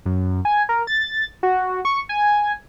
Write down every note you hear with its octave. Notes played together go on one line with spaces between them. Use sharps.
F#2
G#5
A#4
A6
F#4
C#6
G#5